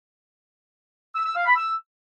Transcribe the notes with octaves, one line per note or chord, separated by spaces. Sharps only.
E6
E6
F5
B5
E6